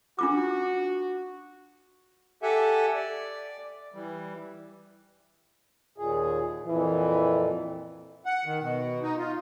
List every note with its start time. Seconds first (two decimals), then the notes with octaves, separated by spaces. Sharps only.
0.19 D4 F4 F#4 D6
2.43 G4 A4 E5 F#5 G#5
2.94 D5
3.94 E3 G3
5.98 D#2 A#2 G#4
6.67 F2 A#2 E3
8.26 F#5
8.45 D#3
8.61 B2
9.02 D#4
9.17 F4